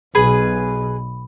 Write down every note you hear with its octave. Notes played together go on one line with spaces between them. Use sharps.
B1 B2 G#4 B4 G#5 B5